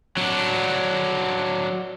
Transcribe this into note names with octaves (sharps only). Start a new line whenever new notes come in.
F#3 D4